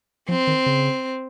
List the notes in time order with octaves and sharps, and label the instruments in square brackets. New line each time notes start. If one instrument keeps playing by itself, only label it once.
[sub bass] F3 [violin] C4
[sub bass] D#3
C#3